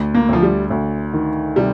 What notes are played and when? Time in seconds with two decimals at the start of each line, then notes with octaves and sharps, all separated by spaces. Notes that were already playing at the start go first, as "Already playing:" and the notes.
Already playing: D2
0.14 A#3
0.29 D2 F3
0.43 G3
0.70 D2
1.13 D#3
1.56 C3 G3